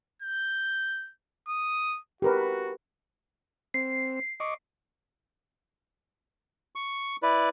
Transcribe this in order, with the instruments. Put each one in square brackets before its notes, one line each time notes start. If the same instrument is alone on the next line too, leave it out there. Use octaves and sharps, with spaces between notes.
[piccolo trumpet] G6
D#6
[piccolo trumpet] F#4 [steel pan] G4 A#4 B4
[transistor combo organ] C4 [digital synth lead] C7
[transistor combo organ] D#5 C#6 D6
[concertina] C#6
E4 B4 D5